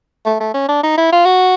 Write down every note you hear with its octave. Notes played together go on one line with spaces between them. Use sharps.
A3
A3
C#4
D4
D#4
E4
F4
F#4